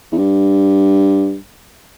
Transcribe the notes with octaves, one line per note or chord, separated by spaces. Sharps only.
E2
G2